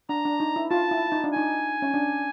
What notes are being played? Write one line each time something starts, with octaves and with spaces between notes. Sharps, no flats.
D4 A#5
D4
D#4
E4
F4 A5
E4
D#4
D4
D#4 G#5
C#4
D4